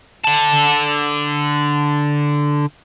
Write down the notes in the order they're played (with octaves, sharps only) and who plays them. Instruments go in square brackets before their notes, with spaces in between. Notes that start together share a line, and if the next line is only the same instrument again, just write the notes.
[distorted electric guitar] D3 A5